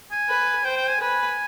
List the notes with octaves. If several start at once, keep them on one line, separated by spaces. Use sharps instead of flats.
G#5
B4
C5 G5
G5
G#5
B4 G#5